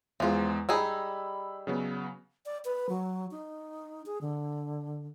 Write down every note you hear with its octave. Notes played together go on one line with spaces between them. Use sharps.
E2 F3 G#3 F4
G3 D#4 G#4 B5 E6
C#3 F#3 B3
D5
B4
F#3
D#4
G#4
D3